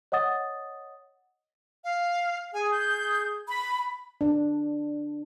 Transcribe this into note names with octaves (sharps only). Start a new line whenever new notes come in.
C#5 D#5 F#5 D#6 A6
F5
G#4 G#5
G6
B5
D4